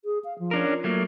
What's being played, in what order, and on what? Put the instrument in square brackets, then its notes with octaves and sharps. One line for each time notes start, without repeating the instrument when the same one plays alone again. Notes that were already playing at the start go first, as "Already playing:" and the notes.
[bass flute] G#4
F5
F3
[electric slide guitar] C#4 D4 A#4
[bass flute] F4
[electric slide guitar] F#3 A3 A#3